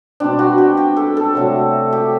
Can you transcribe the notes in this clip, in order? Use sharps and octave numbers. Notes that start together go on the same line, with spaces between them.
B2 G3 C4 D4
F#4
G4
G4
A4
A4
C3 F#3 A3
G4